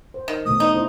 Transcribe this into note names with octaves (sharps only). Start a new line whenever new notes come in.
C5
D#3
B2 E3 A3 D#6
D#4
D4 E4 C5